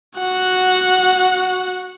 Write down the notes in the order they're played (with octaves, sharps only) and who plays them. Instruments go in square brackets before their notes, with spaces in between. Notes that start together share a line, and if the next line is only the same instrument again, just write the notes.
[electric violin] F#4 F#5